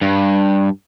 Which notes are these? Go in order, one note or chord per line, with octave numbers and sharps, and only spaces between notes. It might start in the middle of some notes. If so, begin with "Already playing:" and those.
G2